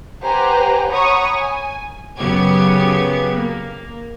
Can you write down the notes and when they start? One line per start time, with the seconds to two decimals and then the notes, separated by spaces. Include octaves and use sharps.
0.23 G4 B4 C5 F#5 G#5 A#5
0.90 C#5 F#5 A#5 B5 C#6 D#6
1.33 G#5
2.17 F#2 C#3 F#3 B3 G4 G#6
3.33 A#3